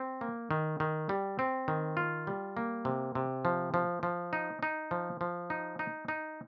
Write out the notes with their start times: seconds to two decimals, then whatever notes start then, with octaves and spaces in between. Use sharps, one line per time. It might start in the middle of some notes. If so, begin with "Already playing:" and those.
Already playing: C4
0.21 A#3
0.51 D#3
0.80 D#3
1.09 G3
1.39 C4
1.68 D#3
1.97 F4
2.27 G3
2.57 A#3
2.85 C3
3.15 C3
3.45 F3
3.74 F3
4.03 F3
4.33 D#4
4.63 D#4
4.91 F3
5.21 F3
5.50 D#4
5.79 D#4
6.08 D#4